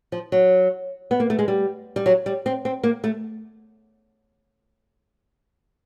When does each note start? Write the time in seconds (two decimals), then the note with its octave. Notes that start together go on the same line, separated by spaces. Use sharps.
0.12 F3
0.32 F#3
1.11 B3
1.20 A#3
1.30 A3
1.39 G#3
1.48 G3
1.96 G3
2.06 F#3
2.26 G3
2.46 C4
2.65 C4
2.83 A#3
3.04 A3